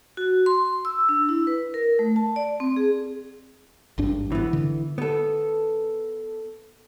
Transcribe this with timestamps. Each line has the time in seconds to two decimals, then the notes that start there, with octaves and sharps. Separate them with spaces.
0.17 F#4
0.46 C6
0.85 E6
1.09 D4
1.29 E4
1.47 B4
1.74 A#4
1.99 A3
2.16 A5
2.36 D5
2.60 C4
2.77 G#4
3.98 G#1 G2 D4
4.32 E3 B3
4.53 D3
4.98 B3 A4